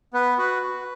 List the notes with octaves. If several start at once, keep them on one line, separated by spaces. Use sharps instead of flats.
B3 B4
F#4 B4
F#4